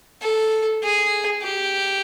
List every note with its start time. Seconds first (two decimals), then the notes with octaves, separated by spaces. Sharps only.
0.23 A4
0.84 G#4
1.43 G4